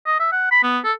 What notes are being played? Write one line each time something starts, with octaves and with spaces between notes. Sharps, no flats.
D#5
E5
F#5
B5
B3
A4